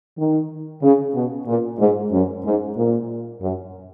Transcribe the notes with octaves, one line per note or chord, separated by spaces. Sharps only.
D#3
C#3
B2
A#2
G#2
F#2
G#2
A#2
F#2